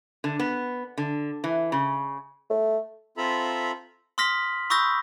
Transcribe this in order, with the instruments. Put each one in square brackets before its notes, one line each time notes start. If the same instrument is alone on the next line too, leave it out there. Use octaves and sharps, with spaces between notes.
[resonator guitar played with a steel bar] D3
B3
D3
E3
C#3
[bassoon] A3
[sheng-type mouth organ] C4 F4 A4 E5 A#5 B5
[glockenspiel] C6 D#6 F6 A#6 B6 F#7
B5 C#6 D#6 E6 G6 A#6